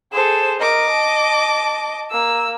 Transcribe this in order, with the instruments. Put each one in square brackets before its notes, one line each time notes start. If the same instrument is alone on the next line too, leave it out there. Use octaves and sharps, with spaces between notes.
[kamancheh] G#4 A4 [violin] C5 E7
[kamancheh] A#4 [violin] D#5 D6
[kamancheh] A5
[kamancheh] A#3 [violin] E6